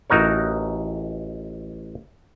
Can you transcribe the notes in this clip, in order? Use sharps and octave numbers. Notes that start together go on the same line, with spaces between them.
A1 D#4 F#4 A#4 C#5